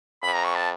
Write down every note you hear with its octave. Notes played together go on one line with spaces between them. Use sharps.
F2 B5
A#5
C#6
A5